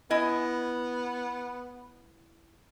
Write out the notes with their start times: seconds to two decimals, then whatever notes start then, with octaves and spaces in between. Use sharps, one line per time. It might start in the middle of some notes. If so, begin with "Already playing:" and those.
0.10 B3 E4 D#5 G#5